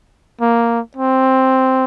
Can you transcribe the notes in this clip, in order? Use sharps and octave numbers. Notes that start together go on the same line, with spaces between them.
A#3
C4